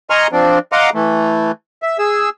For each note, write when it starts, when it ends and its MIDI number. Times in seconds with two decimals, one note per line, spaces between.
0.10 0.27 75
0.10 0.27 80
0.10 0.27 82
0.10 0.27 84
0.10 0.27 85
0.10 0.27 89
0.32 0.59 53
0.32 0.59 60
0.32 0.59 62
0.72 0.90 75
0.72 0.90 77
0.72 0.90 78
0.72 0.90 82
0.72 0.90 84
0.72 0.90 86
0.94 1.51 52
0.94 1.51 57
1.83 1.97 76
1.99 2.29 68
1.99 2.29 88